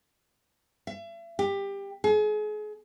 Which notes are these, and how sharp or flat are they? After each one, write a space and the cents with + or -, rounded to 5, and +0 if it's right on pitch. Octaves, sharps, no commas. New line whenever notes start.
E5 +40
G4 +20
G#4 +35